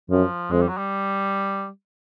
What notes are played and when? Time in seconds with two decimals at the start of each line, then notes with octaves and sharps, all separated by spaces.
0.10 F#2 F3
0.51 F2 G#3
0.61 G3
0.69 F#3
0.77 G3